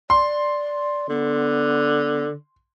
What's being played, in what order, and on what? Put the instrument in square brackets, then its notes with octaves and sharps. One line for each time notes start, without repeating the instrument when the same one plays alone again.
[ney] D5 [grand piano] C6
[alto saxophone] D3 [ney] B3